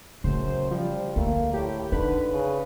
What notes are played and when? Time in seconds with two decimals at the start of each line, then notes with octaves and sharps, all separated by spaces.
0.24 F#2 C#3 A3 C5
0.71 F3 G3
1.16 D2 A3 A#3
1.53 A2 G4
1.92 D3 D4 D#4 B4
2.32 C#3